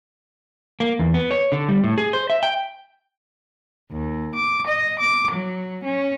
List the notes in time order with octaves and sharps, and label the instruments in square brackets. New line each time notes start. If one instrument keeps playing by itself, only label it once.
[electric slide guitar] A#3
E2
B3
C#5
D3
G3
A2
G#4
C5
E5
G5
[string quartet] D#2
D6
D#5
D6
F#3
C#4